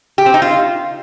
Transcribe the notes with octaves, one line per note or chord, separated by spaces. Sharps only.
G4
C4
D#4
F4